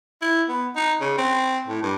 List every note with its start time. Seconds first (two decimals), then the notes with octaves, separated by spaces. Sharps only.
0.21 E4
0.49 B3
0.76 D#4
1.01 C#3
1.17 C4
1.67 A2
1.83 G2